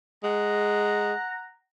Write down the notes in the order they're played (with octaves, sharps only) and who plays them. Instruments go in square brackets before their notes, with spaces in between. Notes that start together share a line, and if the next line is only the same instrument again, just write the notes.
[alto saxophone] G#3 [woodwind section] F#5 A#5